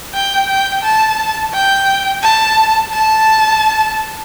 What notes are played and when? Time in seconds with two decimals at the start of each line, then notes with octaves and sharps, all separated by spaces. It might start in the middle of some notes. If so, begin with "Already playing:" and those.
0.14 G5
0.48 G5
0.83 A5
1.54 G5
2.23 A5
2.94 A5